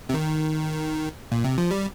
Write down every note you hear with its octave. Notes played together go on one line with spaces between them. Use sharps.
C3
D#3
A#2
C3
F3
G3